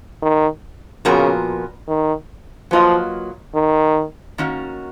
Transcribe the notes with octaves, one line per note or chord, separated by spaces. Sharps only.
D#3
A#2 C#3 F3 B3 F#4 A#4
D#3
F3 F#3 A#3 F4 B4 D#5
D#3
D#3 A#3 C#4 F#4